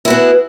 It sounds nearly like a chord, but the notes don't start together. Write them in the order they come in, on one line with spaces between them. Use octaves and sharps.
E4 F#4 B3 G#4